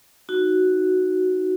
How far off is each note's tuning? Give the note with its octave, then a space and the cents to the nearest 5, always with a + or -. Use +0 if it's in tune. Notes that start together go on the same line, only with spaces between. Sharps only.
D#4 +0 F#4 +0